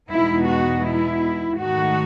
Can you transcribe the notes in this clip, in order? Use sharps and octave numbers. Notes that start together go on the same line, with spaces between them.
E2 B2 G#3 B3 D#4 E4
F#4
E4
G#2 D#3 A3 D#4 F#4